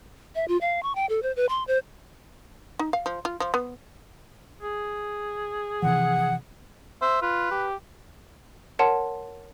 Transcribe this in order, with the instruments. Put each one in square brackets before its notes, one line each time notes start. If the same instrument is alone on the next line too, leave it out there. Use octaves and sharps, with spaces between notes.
[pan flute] E5
F4
F5
C#6
G5
A4
C5
B4
C6
C5
[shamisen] D#4
F5
F3
F4
F3
B3
[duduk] G#4
[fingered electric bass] C3 E3 F3 [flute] F#5
[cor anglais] C5 [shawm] E5
[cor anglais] F4 [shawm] B4
[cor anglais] G4
[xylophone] A#4 C#5 F#5 A5 C6